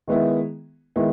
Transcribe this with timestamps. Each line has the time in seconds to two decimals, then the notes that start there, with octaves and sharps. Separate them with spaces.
0.08 D#3 G#3 B3 E4
0.96 D#3 G#3 B3 E4